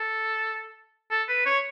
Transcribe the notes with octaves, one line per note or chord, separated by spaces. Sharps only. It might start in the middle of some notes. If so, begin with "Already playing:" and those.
Already playing: A4
A4
B4
C#5